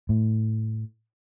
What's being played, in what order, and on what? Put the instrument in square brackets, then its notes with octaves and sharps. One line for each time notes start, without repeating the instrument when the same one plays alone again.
[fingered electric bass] A2